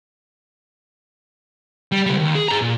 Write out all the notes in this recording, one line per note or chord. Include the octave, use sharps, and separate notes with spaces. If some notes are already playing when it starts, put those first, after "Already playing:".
G3
C#2 G3
D#2
G#4
G#4 A#5
A#2